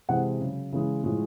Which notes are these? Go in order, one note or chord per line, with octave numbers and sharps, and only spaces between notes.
C3 E3 G#3 F#5
C#3 F#3
C#3 E3 G#3
A2 F3 G#3